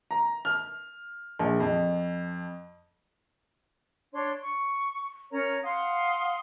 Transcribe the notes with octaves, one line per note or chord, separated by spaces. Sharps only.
A#5
F6
A#1
F2
D4 C#5 C6
C#6
C#4 A#4 C#5 A#5
F5 F#5 C6 D#6